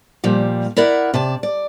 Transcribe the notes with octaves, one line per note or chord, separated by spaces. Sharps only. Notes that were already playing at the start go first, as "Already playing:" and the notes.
A#2 F3 G3 A#3
E4 A#4 D5 E5 F#5
C3 D5 A5
D5